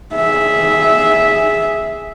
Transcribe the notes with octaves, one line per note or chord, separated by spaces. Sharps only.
G#4 E5